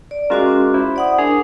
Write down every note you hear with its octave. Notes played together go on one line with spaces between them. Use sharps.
D5
G#3 C#4 F4 F#4 A#4 D6
E4 C5
D5 F#5 D#6
D4 G#4 A#4